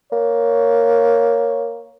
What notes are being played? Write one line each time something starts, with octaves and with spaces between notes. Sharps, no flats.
A#3 C#5